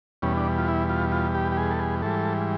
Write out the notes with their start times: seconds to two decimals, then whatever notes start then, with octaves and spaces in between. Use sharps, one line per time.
0.22 E2 B2 G3 C#4
0.37 D4
0.58 F4
0.68 E4
0.89 F4
1.12 F4
1.35 G4
1.52 G4
1.57 G#4
1.71 A4
1.79 G#4
2.02 G#2 E3 G3 A4